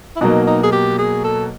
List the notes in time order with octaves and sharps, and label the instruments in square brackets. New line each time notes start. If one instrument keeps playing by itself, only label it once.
[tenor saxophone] E4
[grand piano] B2 F#3 A#3 [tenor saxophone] D#4
[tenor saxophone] D#4
G#4
G4
G#4
A4